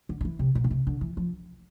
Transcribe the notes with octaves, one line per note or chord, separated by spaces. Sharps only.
D3
D3
E3
C3
B2
D3
C3
D3
E3
F3